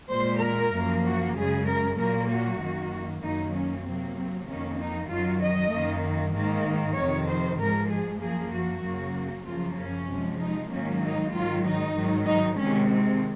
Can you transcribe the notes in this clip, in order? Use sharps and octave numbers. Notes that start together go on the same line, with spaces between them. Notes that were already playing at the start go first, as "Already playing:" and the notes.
A#2 G#3 C5
A#4
F#2 F3 A#3
F#4
F#2 C#3 G#3 G#4
A#4
A#2 F#3 A#3 A#4
F#4
F#2 D#3 A#3
F#2 D#3 F#3 A#3 D#4
C#4
C3 F#3 A#3 C4
C4
F2 D#3 A#3 C#4
D#4
F#2 D#3 F#3 F4
D#5
F#2 D#3 A#3
G#2 D#3 A#3
F2 C3 D#3 C#5
C5
G#2 F3 G#3 A#4
G#4
F#2 F3 A#3 G#4
F#4
F#2 C#3 F#3 A#3
F#2 C#3 F3 A#3 F4
C#4
C3 F3 G#3
D#4
G#2 D#3 F#3 A#3 C#4
D#4
G#2 D#3 F#3 F4
D#4
G#2 D#3 F#3
D#4
C3 D#3 G#3 C#4
C4